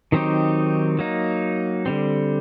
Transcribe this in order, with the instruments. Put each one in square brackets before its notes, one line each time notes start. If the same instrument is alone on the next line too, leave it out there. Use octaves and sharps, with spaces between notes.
[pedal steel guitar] D#3 F#3 C4 D#4 G4
F#3 A#3 D#4
D3 G3 C4